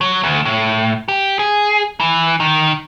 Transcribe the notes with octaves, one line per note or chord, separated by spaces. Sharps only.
F#3
D2
A2
G4
G#4
E3
D#3